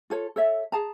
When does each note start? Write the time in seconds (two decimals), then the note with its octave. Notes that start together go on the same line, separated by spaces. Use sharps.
0.10 F4 A4 C#5
0.36 A4 C#5 E5
0.72 G#4 A5 A#5